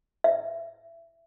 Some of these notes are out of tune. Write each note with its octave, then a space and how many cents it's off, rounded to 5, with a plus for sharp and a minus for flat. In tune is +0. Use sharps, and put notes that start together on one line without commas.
E5 +15